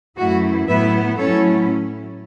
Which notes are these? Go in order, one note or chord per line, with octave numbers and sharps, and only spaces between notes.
F#2 E3 A3 E4 F#4
A2 F#3 B3 E4 B4 E5
A2 F#3 C#4 E4 A4 C#5